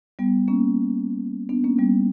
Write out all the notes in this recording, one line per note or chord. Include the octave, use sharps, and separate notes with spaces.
G3 B3
A#3 C#4
B3 D4
A#3 C#4
G3 B3